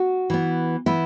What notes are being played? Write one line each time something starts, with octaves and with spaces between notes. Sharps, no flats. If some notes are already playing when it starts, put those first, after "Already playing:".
Already playing: F#4
E3 B3
E3 B3 E4